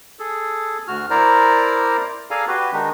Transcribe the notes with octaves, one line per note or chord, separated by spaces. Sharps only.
G#4 A4
D2 F#4 F6
E4 A#4 C5 D5 A#5
G#4 A4 D5 F5 G#5 A#5
F#4 G4 B4
D#3 G#3 D4 D#4